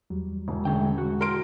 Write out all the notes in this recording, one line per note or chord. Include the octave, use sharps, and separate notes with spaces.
E2 F#3 G3
E1
D3 G#3 A3 C#4 G5
F#4
A#4 C6 D7